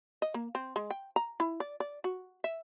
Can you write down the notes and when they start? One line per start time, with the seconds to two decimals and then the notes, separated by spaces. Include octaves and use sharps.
0.22 D#5
0.34 A#3
0.55 C4
0.76 G#3
0.90 G5
1.16 A#5
1.40 E4
1.60 D5
1.80 D5
2.04 F#4
2.44 E5